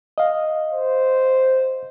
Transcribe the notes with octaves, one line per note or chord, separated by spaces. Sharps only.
D#5 F5
C5